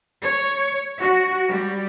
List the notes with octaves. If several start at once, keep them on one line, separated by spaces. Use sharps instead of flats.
C#5
F#4
G3